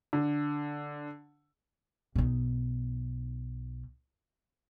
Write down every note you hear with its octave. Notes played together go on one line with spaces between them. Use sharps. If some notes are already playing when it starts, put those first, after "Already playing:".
D3
B1 D#4